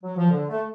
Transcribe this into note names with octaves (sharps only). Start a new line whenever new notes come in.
F#3
F3
D3
A3